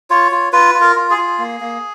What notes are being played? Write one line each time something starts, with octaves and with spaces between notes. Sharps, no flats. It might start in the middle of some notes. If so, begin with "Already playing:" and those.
F4 C#5
F4
F4 B4
F4
A#4
F4
G#4
F4
A#3
A#3